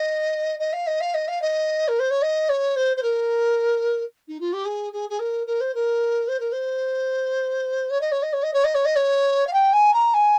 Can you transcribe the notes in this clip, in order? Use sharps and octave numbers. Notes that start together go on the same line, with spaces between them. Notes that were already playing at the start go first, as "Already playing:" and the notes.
Already playing: D#5
D#5
F5
D#5
F5
D#5
F5
D#5
A#4
C5
C#5
D#5
C#5
C5
C5
A#4
D#4
F4
G4
G#4
G#4
G#4
A#4
A#4
C5
A#4
C5
A#4
C5
C#5
D#5
C#5
D#5
C#5
D#5
C#5
D#5
C#5
D#5
C#5
F5
G5
G#5
A#5
G#5